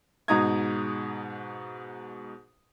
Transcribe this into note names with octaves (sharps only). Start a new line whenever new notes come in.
G#2 B2 D#4 A#5 D#6 G#6